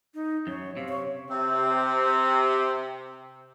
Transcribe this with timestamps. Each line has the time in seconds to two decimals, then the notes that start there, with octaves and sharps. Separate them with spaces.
0.14 D#4
0.47 F#2 C#5
0.77 C3 F5
0.88 C#5
1.29 C3 C4